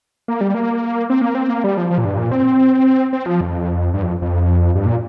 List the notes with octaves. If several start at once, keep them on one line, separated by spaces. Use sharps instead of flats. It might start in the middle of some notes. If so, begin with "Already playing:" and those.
A#3
G3
A#3
C4
A#3
C4
A#3
G3
F3
F3
A#2
G2
A#2
C4
C4
F3
F2
G2
F2
F2
G2
A#2